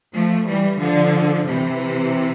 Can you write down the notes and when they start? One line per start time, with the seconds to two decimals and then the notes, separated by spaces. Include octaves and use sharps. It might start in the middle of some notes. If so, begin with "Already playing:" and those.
0.13 F3 A3
0.46 E3 G3
0.80 D3 F3
1.47 C3 E3